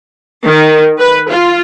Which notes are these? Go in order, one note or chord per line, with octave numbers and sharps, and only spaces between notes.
D#3
B4
F4